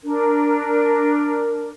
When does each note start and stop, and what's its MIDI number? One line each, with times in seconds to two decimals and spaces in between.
0.04 1.70 62
0.04 1.70 70